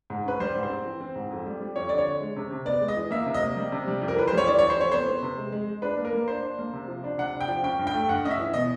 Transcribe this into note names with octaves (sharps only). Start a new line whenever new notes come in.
G#2
C#4 B4
G3 C5
G#2
C5
C4
E3
C4
G#2
F2
G3
G3
F2 C#5
D3 D5
C#5
D3
G#3
C3
C3
B3 D5
G#3
D#5
E3
A#3 E5
C3
D#5
A#3
G3
C3
G3
F2
A#4
E3 B4
C5
G3
C#5
E3 D5
E3 C#5
C5
F2 C#5
B3 C5
B3
C3
G#3
G#3
G#3
D4 B4
A#3
A#4
A#3
D4 C5
D4
A#3
C3
F3
D4
C3 F#5
D4
G5
F3
C#4 G5
G2
G5
A3
G2 F#5
C#4 D#5
E5
E3
B2 D#5